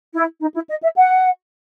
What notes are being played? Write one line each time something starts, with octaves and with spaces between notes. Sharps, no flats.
E4
D#4
E4
D#5
E5
F#5